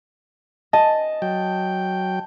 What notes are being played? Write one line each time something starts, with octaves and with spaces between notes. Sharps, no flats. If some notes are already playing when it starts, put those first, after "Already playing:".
D#5 A5
F#3 G5